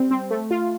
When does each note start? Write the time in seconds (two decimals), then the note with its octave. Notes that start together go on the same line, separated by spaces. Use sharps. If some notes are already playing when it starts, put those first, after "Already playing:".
Already playing: G3 C4
0.11 C4
0.31 A3
0.51 F4